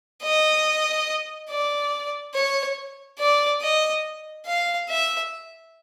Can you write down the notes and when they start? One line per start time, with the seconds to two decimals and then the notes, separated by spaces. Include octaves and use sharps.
0.23 D#5
1.50 D5
2.34 C#5
3.19 D5
3.62 D#5
4.46 F5
4.89 E5